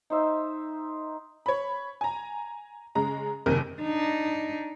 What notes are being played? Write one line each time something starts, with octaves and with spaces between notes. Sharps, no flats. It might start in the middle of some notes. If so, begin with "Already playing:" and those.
D#4 C5 E5
C#5 B5
G#5 A#5
C#3 G#3 A#5
F#1 D#2 C3 A#4
D4 D#4